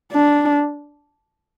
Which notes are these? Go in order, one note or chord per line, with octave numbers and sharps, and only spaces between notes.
D4